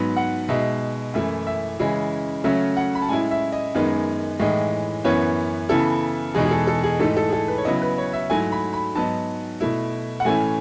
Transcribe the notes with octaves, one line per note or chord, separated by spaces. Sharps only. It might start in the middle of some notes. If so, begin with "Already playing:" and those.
Already playing: G#2 F#3 B3
F#5
B2 G#3 D#4 E5
F#2 E3 A3 E4 E5
E5
C#3 E3 G#3 C#4 E4
C#3 F#3 A3 C#4 E5
F#5
B5
A5
A2 G#3 C#4 E4 G#5
E5
D#5
F#2 D#3 G#3 B3 D#4
A2 E3 G#3 D#4
F#2 E3 B3 C#5
C#3 E3 B3 E4 A4
E2 B2 G#3 D#4 G#4
G#4
A4
A4
G#4
G#2 E3 A3 D#4 A4
A4
G#4
A4
B4
C#5
C#3 F#3 B3 E4 D#5
B4
C#5
E5
G#2 F#3 A3 E4 G#5
B5
B5
G#2 F#3 B3 D#4 A5
B2 A3 E4
F#5
A2 E3 A3 C#4 E4 G#5